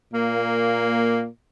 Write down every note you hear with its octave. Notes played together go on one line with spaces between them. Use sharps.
A#2 A#3